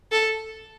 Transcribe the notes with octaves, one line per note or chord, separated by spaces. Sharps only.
A4